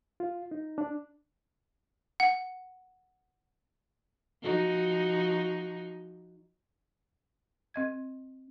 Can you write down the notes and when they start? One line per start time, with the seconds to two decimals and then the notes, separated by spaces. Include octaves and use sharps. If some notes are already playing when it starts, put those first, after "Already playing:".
0.20 F4
0.51 D#4
0.78 D4
2.20 F#5
4.42 F3 D#4 F#4
7.74 C4 D#5 G#6